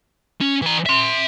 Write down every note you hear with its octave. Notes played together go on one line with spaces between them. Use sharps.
C#4
E3 A#5
E5 C6